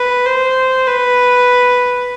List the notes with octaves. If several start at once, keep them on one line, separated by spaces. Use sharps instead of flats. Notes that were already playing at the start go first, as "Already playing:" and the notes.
Already playing: B4
C5
B4